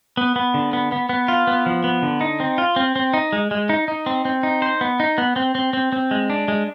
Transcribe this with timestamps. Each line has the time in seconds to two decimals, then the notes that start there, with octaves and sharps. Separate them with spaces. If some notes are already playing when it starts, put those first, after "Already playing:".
0.17 B3
0.36 B3
0.54 D3
0.73 B3
0.92 B3
1.09 B3
1.28 F4
1.47 B3
1.66 F3
1.84 B3
2.02 D3
2.21 D#4
2.40 C4
2.58 F4
2.76 C4
2.96 C4
3.14 D#4
3.33 G#3
3.51 G#3
3.69 D#4
3.88 D#4
4.06 C4
4.25 C4
4.43 D#4
4.62 C5
4.81 B3
5.00 D#4
5.18 B3
5.36 C4
5.55 C4
5.73 C4
5.92 C4
6.11 G#3
6.30 D4
6.48 G#3